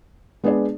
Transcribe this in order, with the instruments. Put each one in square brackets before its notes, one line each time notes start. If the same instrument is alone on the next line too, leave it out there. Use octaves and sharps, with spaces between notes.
[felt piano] G#3 B3 D4 G#4 D5